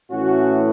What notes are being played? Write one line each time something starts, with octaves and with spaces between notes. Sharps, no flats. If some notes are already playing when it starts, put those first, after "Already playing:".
A2 E3 A3 C#4 F#4